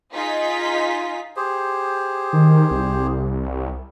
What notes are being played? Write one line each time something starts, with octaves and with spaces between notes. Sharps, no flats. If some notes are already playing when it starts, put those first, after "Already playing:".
D#4 F4 G#4 B6
G4 G#4 C5
D#3
C2